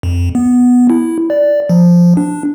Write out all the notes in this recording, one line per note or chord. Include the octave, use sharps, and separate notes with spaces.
F2
B3
E4
D5
F3
D4